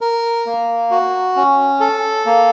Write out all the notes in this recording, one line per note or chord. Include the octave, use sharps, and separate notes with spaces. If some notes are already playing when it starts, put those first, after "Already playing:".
A#4
A#3
F#4
C#4
A4
A#3